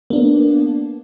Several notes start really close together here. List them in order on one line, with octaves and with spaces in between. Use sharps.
A#3 D4 B3